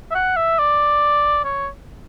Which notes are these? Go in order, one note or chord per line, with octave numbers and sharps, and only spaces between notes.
E5
F#5
E5
D5
C#5